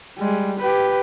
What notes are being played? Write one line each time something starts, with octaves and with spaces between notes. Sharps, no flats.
G3 G#3
G4 B4